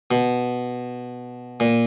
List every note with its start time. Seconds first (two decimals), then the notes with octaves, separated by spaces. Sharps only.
0.11 B2
1.60 A#2